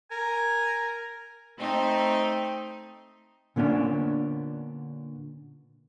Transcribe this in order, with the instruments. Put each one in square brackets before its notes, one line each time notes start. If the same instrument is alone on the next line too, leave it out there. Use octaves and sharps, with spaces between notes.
[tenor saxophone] A#4 [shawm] G#5
[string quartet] A3 C4 D#4
[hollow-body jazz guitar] A#2 D3 B3 C#4 D4